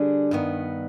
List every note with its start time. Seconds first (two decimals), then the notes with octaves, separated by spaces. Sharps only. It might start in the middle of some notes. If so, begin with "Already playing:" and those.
Already playing: D3 G3 D4 G#4
0.31 G2 D#3 B3